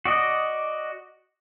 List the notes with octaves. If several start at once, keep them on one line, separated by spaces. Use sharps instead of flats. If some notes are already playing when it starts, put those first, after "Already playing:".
F#4 D5 D#5